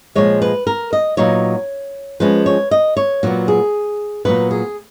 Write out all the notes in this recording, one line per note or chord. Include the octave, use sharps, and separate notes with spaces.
A#2 F3 G#3 C#5
B4
A#4
D#5
A#2 F#3 B3 D#4 C#5
F3 G#3 C#4 B4
C#5
D#5
C#5
A#2 F#3 B3 F#4
G#4
A#2 F#3 B3 B4
G#4